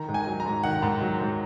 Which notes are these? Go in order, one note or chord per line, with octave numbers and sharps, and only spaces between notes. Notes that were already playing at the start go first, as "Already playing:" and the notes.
Already playing: D#3 A#5
G#2
G#5
F#3
A#5
G#2
D#3 F#5
G#2
F#3
G#2